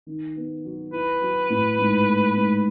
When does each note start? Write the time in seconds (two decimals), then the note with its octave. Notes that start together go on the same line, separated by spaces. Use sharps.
0.07 D#3
0.36 B3
0.65 F#3
0.92 E4 B4
1.21 F#3
1.50 A2
1.79 G#2
2.07 A3
2.35 G#2